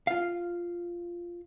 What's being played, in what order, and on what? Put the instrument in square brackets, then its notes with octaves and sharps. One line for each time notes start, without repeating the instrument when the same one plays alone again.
[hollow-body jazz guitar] F4 F5